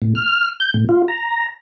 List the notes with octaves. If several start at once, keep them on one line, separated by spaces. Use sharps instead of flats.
A2
F6
G6
A2
F4
A#5